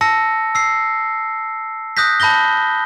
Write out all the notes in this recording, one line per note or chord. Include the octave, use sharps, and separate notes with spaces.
A5 E6 A#6 C#7
E6 C7
D#6 F#6 G6 A#6 B6
A5 B5 G6 A#6 G7